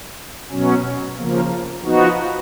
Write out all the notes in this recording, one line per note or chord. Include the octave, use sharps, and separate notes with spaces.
B2 F#3 C#4
C#3 F3 A#3
F3 B3 D#4 F#4